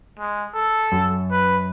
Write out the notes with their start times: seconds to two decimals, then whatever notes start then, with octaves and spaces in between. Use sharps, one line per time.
0.19 G#3
0.54 A4
0.92 F#2
1.31 B4